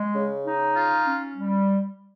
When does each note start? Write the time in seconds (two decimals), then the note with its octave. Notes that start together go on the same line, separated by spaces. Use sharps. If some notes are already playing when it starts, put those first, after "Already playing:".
Already playing: G#3
0.15 C#3
0.46 D#4
0.76 F4
1.07 C#4
1.36 G3